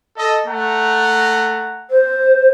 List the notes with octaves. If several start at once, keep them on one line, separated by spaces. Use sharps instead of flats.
A4 D#5
A3 F#5 A#5
C5